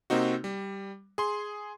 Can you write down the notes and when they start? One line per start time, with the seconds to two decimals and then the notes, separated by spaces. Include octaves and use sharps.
0.10 C3 A#3 C4 D#4 F#4
0.44 G3
1.18 G#4 C6